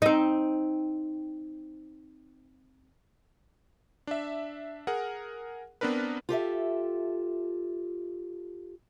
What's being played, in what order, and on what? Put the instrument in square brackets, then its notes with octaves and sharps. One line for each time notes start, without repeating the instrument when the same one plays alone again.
[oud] C4 D#4
[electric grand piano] D4 E5
G#4 A#4 F#5
B3 C4 D4 A#4 B4
[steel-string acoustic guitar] F4 G4 A4 E5